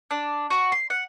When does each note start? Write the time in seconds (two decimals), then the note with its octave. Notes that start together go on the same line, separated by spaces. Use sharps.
0.11 D4
0.50 F#4
0.72 C6
0.90 F#5